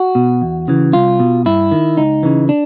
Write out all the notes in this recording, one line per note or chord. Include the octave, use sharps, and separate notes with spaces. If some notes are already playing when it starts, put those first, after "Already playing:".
Already playing: F#4
B2
E2
C#3 E3
C2 F4
B2
G2 E4
D#3
C#2 D#4
C#3 E3
D4